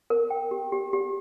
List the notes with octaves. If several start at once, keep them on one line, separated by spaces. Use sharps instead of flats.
A#4
G5
G4
G4
G4